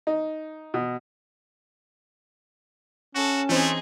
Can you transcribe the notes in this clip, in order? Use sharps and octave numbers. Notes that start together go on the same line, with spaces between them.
D#4
B2
C#4 F#4 A4 A5
E3 A3 C4 D#4 G#4